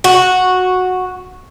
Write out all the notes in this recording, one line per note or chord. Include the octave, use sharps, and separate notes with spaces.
F#4